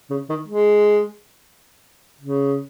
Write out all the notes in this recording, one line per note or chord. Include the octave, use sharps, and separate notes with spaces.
C#3
D#3
G#3
C#3